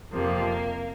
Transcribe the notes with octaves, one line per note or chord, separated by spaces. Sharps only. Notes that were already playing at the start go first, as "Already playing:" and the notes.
F2 C3 F3 A#3